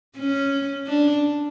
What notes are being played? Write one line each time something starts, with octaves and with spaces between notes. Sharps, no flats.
C#4
D4